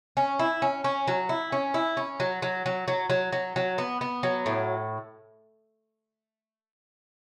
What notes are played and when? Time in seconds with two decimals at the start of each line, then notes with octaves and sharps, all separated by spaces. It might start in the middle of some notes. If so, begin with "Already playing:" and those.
0.17 C#4
0.39 E4
0.62 C#4
0.84 C#4
1.08 F#3
1.29 E4
1.52 C#4
1.74 E4
1.97 C#4
2.20 F#3
2.42 F#3
2.66 F#3
2.88 F#3
3.10 F#3
3.32 F#3
3.56 F#3
3.78 B3
4.01 B3
4.23 F#3
4.46 A2